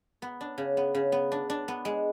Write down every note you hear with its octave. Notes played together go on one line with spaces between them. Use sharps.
B3
D4
C#3
B3
C#3
B3
D4
D4
B3
G#3